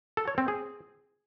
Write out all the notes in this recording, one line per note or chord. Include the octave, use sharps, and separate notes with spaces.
A4
C#5
C4
G#4